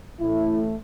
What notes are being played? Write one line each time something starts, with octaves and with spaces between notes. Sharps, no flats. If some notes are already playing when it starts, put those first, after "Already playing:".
A1 A2 A3 E4